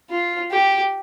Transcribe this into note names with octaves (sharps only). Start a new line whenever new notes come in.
F4
G4